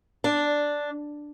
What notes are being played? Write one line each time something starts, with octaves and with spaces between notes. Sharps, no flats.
D4